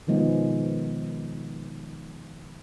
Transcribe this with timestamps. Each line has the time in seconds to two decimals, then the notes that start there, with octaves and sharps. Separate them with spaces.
0.07 B2 D#3 F3 G#3 B3